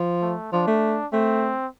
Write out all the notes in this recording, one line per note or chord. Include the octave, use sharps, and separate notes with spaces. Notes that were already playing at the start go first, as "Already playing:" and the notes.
Already playing: F3
A3
F3 D4
A3
A3 C4